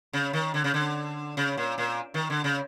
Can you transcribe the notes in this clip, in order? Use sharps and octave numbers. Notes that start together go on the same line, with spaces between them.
C#3
D#3
D3
C#3
D3
C#3
A#2
A#2
D#3
D3
C#3